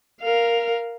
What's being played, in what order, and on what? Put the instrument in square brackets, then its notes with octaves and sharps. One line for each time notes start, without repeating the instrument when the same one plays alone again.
[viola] A#4 F5